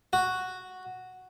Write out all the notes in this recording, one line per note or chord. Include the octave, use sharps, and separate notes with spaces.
F#4